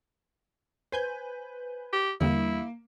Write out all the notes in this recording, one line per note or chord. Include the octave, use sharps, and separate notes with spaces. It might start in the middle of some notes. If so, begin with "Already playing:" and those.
B4 C5 G#5 G6
G4
E2 D3 G3 A#3 E4